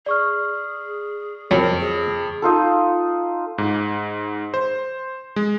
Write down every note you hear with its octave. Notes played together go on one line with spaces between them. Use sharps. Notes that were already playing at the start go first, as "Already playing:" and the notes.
G#4 D5 C#6 F6
F2 F#3 A#4
G#4
D#4 F4 A4
G#2
C5
G#3